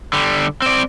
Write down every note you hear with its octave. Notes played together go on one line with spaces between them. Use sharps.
D3 G3
C4 D5